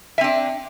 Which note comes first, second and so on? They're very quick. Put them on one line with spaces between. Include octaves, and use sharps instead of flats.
E5 C4 D4